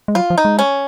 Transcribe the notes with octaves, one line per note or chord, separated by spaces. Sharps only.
G#3
F#3 F4
F3
D#4
G#3
C#4